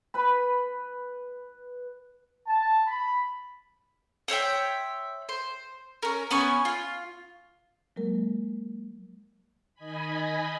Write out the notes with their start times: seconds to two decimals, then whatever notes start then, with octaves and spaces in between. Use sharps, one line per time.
0.14 B4 B5
2.47 A5
2.87 B5
4.28 C5 C#5 E5 G5
5.29 C5
6.03 C#4 A#4
6.31 B3 C#4 G#5 C#6
6.65 F4
7.96 F#3 G#3 A#3 A#4
9.74 D#3 D#5 G#5 B5